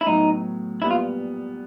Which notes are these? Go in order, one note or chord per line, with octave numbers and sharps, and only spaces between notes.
E4
A2 F#3 B3 D#4
A#2 G3 B3 E4
F4